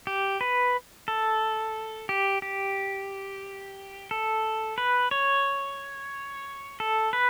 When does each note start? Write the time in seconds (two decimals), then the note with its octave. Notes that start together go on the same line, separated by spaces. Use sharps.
0.07 G4
0.41 B4
1.08 A4
2.09 G4
2.42 G4
4.11 A4
4.78 B4
5.11 C#5
6.80 A4
7.13 B4